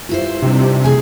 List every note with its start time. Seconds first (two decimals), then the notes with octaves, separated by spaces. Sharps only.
0.09 G2 E4 F4 C5
0.42 C3 G3 D4 D#4
0.61 C4
0.84 A3 G#4 G#5